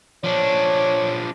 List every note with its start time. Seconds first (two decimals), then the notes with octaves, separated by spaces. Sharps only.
0.24 F3 D4 C#5